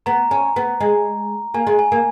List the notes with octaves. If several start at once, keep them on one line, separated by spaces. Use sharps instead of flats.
B3 A#5
C#4
B3
G#3
A#3 G#5
G#3
G#5
A#3